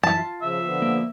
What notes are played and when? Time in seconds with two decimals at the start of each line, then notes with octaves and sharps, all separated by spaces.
0.03 F#2 E3 E5 A5
0.17 F4
0.42 C#3 F3 E5
0.64 D3 F3 B3
0.82 A#3